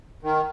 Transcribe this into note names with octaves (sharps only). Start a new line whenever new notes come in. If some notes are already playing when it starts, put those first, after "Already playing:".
D#3